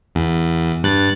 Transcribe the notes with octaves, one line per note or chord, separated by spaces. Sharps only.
E2
G2 F#6 A6